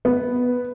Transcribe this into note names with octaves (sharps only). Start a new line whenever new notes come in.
B3